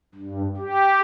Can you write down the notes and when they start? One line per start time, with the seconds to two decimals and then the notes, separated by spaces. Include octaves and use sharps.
0.15 G2
0.57 G4